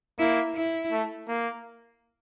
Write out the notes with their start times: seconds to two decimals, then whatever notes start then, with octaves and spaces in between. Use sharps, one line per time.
0.19 A#3 E4
0.55 E4
0.92 A3
1.28 A#3